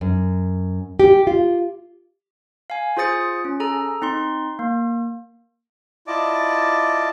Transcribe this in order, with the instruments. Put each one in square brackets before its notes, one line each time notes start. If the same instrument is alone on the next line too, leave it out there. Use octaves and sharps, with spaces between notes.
[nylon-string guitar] F#2
G4
F4
[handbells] F5 G#5
F4 G#4 C5 D#6 A6 C#7
C#4
G#4 A4 A#5
C4 D#4 C6
A#3
[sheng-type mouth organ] E4 F4 D5 D#5 A5 D6